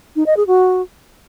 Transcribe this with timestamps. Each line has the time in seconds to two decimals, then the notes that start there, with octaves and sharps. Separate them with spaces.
0.16 D#4
0.26 D#5
0.37 G#4
0.47 F#4